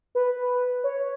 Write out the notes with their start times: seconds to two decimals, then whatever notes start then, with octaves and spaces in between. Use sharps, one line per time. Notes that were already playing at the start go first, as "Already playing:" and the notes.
0.15 B4
0.84 C#5